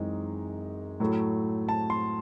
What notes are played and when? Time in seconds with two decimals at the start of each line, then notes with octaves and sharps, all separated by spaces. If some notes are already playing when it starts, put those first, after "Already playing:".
Already playing: F#2 E3 G#3 C4 D#4
1.00 A2 F#3 A3
1.69 A5
1.90 C6